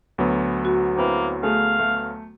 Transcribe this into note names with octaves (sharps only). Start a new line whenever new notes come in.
D2 F#3 B3
F#4
A#3 C4 E4 B4
A3 G#4 F5
A3